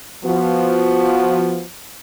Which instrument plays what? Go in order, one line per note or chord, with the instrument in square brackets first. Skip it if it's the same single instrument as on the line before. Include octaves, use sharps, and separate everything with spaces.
[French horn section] F3 B3 F#4